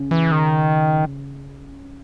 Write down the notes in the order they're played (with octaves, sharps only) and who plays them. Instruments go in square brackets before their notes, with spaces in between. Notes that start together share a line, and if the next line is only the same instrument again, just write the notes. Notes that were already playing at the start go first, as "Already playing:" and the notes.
Already playing: [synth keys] C#3
[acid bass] E3
D#3